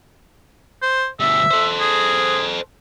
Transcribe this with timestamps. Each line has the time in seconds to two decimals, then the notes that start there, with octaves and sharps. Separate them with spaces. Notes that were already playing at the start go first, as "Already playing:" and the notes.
0.82 C5
1.20 D2 G3 E5
1.51 A4 C5
1.80 G#4